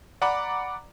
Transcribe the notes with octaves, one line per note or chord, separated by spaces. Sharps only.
D5 F#5 A#5 B5 D6